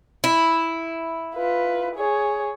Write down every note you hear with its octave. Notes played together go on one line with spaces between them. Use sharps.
E4
F4 B4
G#4 C#5